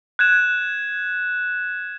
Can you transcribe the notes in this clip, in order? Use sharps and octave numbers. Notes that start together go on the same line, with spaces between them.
F#6 G#6 E7